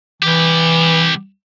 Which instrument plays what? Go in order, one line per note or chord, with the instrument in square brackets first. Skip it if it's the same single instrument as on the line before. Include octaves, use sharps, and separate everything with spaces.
[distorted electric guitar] C2 G4 [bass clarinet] E3